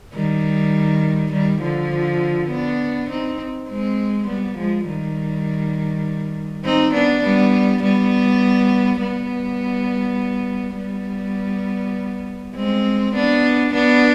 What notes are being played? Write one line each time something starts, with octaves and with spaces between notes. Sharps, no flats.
D#3 G3
D#3 G3
D3 F3
B3 D4
C4 D#4
G#3 C4
G3 B3
F3 G#3
D#3 G3
C4 D#4
B3 D4
G3 B3
G3 B3
G3 B3
G3 B3
G#3 C4
B3 D4
B3 D4